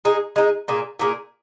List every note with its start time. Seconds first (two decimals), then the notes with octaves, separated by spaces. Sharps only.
0.05 G#3 D#4 G#4
0.36 G#3 D#4 G#4
0.68 A#2 A#3 G#4
1.00 A#2 A#3 G#4